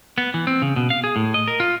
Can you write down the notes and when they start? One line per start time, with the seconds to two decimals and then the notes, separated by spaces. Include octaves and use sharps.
0.18 B3
0.34 E3
0.47 C4
0.62 C#3
0.76 B2
0.90 F5
1.04 G#4
1.16 A2
1.34 D#5
1.48 A#4
1.60 F4